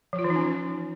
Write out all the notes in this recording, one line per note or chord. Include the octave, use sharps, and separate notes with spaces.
F3
F4
E3
D#4
C#4